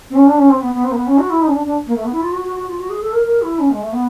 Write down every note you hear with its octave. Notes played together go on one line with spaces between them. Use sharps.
C4
C#4
D4
C#4
C4
B3
B3
C4
A#3
B3
C#4
F#4
E4
D#4
C#4
D4
D4
A#3
A3
B3
E4
F4
F#4
F#4
F#4
F4
F#4
G#4
A4
A#4
A#4
E4
C#4
G#3
A3
B3